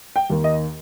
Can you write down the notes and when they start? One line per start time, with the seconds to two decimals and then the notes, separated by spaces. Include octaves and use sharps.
0.16 G5
0.30 D#2 D#3
0.44 D#5